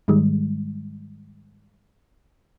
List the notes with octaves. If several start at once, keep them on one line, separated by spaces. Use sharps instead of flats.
G#2 D#3 G3 G#3